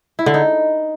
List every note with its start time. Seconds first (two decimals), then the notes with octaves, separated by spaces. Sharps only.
0.19 E4
0.26 D3
0.34 D#4